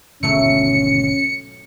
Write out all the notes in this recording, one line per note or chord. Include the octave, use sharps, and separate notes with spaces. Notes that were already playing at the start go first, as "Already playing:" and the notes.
G#1 B2 D3 F#3 A3 C#4 C#7